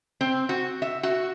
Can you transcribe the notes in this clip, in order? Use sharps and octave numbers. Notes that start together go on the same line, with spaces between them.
C4
F#4
E5
F#4